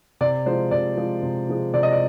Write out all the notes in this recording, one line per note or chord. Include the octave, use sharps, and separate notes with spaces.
C3 D5
F3 G#3 C5
C3 D5
F3 G#3
C3
F3 G#3
C3 D5
D#5
D5